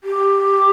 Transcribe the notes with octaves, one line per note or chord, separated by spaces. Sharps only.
G4